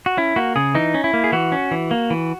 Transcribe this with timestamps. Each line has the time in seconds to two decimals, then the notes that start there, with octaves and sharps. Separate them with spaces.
0.06 F#4
0.17 C#4 E4
0.36 A#3 F#4
0.56 C#3 G#4
0.75 E3 D#4
0.94 C#4
1.04 E4
1.14 A#3
1.24 G#4
1.32 E3 F#4
1.52 C#4
1.71 E3
1.91 A#3
2.10 E3